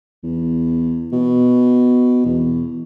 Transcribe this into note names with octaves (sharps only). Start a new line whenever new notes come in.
E2
B2
E2